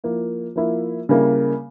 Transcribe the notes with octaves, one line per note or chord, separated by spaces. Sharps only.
F3 A#3 E4
F3 A#3 E4
C#3 G3 A#3 E4